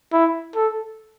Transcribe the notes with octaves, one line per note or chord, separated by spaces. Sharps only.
E4
A4